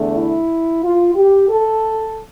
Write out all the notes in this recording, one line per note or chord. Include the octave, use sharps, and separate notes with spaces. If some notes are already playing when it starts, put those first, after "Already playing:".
Already playing: E2 D3 A3
E4
F4
G4
A4